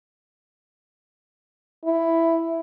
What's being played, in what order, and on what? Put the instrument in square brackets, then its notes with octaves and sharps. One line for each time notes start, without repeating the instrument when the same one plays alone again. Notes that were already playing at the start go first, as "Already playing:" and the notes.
[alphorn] E4